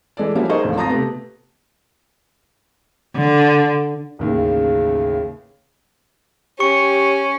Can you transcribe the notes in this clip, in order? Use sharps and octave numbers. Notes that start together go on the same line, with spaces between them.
E3 G#3 A4 D5
F3 G3 A#3 C#4 E4 F#4
D#4 G#4 A#4 C5 D#5 C#6
A#1 D#2 A2
G#1 F4 A5 A#5 D#6 A#6
C3 A3 B3
D3
A1 D#2 C#3
C#4 G4 C#6 C#7